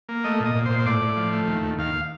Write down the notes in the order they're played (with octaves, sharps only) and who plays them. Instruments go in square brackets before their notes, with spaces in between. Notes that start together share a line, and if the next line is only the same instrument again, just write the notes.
[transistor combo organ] A#3
A3 D#5
A#2
D#5
A#2
A#2 C5
C5
A2 D5
A2
F3
A3
D#2
D#2
D#2 F5